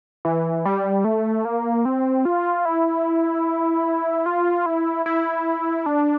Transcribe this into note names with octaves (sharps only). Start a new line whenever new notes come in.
E3
G3
A3
A#3
C4
F4
E4
F4
E4
E4
D4